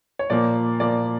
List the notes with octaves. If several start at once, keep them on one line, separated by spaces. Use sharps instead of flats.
C#5
A#2 F3 A#3 D5
A#2 F3 A#3 D5